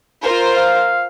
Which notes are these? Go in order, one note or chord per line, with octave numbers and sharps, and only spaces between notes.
F4 A#4 C5
F5